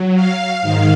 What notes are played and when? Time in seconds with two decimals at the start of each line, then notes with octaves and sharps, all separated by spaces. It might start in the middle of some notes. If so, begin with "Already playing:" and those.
Already playing: F#3
0.15 F5
0.62 G#2 D#3 F5